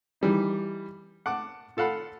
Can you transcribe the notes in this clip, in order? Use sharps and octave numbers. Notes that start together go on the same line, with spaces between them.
E3 G3 D#4
F#5 A5 D6
F4 A4 F5 F#5 B5